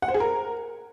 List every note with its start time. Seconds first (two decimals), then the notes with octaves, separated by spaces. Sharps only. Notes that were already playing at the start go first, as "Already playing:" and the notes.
0.02 F#5
0.08 C5
0.14 G#4
0.20 A#4